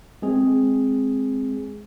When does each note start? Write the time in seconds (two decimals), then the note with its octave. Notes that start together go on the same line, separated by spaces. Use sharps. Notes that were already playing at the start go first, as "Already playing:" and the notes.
0.22 G#3 C4 G#4